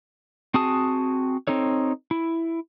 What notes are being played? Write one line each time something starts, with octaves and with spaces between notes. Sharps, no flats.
C4 F#4 G#4 A5 D#6
C4 D#4 A4 C#5
E4